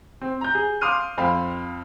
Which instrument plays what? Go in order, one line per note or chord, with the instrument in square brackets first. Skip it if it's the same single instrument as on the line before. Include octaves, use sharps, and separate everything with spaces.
[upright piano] C4
A#5 G6
G#4
F5 C6 D6 D#6 F6 D#7
F2 C4 F5 B5